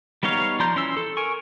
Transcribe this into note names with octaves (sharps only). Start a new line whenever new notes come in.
G3 B3 D#4 C#5 F5
F3 D5 A#5 C6 G6
E3 C#4 C6 E6
A4
A#4 G#5 C#6